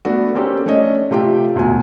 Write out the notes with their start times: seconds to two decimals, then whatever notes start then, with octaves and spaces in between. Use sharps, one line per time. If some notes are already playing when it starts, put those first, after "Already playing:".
0.05 A3 B3 D4 F#4
0.35 A#3 C4 C#4 G4 A4
0.66 A3 C#4 D4 C#5 D#5
1.11 C3 A3 F4 G4 G5
1.55 E1 D2 B2 G#5